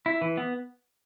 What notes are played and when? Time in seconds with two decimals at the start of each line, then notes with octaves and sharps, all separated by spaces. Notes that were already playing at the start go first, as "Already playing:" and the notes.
0.06 E4
0.22 E3
0.37 B3